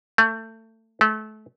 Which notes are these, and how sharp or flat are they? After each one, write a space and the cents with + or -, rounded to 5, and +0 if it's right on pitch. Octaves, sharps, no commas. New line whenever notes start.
A3 +25
A3 -30